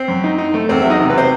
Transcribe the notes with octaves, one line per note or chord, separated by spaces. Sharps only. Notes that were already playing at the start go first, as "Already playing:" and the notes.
Already playing: C4 C5
F#2
D#4
D#4
A3
E2 C4 C5
F#3 E5
D#4 D#5
C3
B4
C3 C5